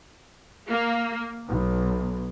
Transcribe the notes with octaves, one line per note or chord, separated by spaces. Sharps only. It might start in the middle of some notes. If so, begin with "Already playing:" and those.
A#3
B1